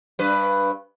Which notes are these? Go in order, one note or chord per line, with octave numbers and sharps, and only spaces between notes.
G2 B4